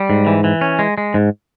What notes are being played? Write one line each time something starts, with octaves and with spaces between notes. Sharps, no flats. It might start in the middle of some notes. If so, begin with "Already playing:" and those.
Already playing: G3
G#2
E3
E3
C#4
G#3
G#3
G#2